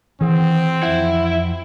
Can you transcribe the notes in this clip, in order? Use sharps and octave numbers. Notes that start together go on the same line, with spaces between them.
D#3 E3 C4 G#4 F#5
F2 E4 F#5